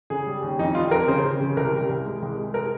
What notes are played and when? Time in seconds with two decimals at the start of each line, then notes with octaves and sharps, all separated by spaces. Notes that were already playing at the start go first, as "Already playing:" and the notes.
0.10 C#3 G#4
0.27 G3
0.42 D#2
0.59 F2 D#4
0.75 G3 F4
0.91 F2 A#4
1.07 C#3 C5
1.24 C#3
1.40 C#3
1.57 C2 A#4
1.73 G3
1.89 C2
2.05 G#3
2.22 C2
2.38 G#3
2.54 A#4